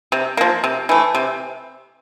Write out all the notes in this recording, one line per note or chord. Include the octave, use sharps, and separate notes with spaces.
C3
F3 A#3
C3
E3 A3
C3